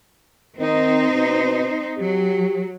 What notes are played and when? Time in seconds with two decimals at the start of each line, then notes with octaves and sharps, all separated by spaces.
0.60 D#3 C4 D#4 C5
1.14 B2
1.98 F#3 G4